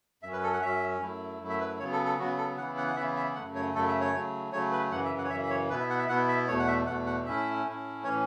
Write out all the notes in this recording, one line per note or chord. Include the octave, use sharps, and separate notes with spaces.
F#2 F#3 C#4 E5
B4
A4
F#5
F#2 F#3 C#4 E5
F#2 F#3 A3 E4
F#2 F#3 A3 E4
E5
B4
C#3 F#3 B3 C#5
A4
A4
C#3 F#3 B3 F#4
A4
C#3 E3 B3 E4 F#5
F#5
F#5
C#3 E3 B3 E4 E5
E5
F#2 C#3 A3 F#5
C#5
F#2 C#3 A3 A4
E5
C#5
C#3 F#3 A3
C#3 F#3 A3 C#5
B4
F#2 C#3 E3 F#5
E5
F#5
C#5
F#2 C#3 E3 E5
E5
C#5
B2 B3 E4 B4
E5
F#5
E5
B2 B3 E4 F#5
E5
E2 B2 A3 C#5
F#5
E5
E2 B2 A3 F#5
F#5
A2 A3 C#4 E4 E5
A2 A3 C#4 E4
A2 E3 C#4 C#5